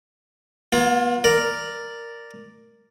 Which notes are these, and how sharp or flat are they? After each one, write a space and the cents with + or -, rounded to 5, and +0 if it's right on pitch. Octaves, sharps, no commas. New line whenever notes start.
B3 -30 F4 +25
A#4 +0 D5 +0